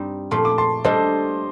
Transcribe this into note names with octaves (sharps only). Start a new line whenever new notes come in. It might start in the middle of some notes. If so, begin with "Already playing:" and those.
Already playing: G2 G3 C4 D#4
A#2 F3 A3 C6
D6
A5 C6
G3 D4 A4 C5 D#5